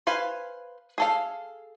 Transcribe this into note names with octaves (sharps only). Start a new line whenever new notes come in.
B4 C5 F5 G#5
G#4 A4 F5